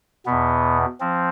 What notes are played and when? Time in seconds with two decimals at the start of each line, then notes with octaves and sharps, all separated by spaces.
0.26 E2 B2 B3
1.00 F3 C4